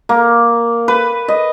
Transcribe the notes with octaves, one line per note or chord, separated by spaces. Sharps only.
A#3
B4
D#5